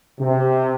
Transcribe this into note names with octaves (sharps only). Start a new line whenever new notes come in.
C3